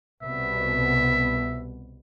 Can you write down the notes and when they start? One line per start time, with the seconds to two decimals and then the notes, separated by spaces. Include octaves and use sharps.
0.22 C2 B2 B3 E5